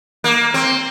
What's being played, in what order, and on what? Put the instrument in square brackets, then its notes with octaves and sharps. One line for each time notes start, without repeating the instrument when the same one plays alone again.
[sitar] A#3
C4